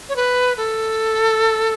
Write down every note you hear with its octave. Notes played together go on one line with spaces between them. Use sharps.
C#5
B4
A4